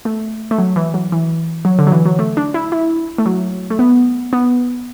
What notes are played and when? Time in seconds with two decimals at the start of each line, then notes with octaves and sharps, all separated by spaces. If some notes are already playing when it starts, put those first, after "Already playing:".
0.05 A3
0.51 A3
0.58 F#3
0.76 E3
0.94 F#3
1.12 E3
1.65 F#3
1.79 D3
1.87 F#3
1.92 E3
2.05 F#3
2.19 A3
2.37 D4
2.54 E4
2.72 E4
3.18 A3
3.26 F#3
3.70 A3
3.79 B3
4.33 B3